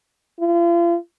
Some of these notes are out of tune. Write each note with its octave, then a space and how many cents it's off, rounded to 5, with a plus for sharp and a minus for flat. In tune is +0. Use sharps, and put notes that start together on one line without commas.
F4 -40